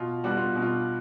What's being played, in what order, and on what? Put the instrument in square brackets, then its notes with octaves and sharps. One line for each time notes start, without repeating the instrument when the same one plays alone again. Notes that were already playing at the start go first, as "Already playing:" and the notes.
Already playing: [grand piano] B2 F4
G3 B3 D4 F#4
F4
B2
F4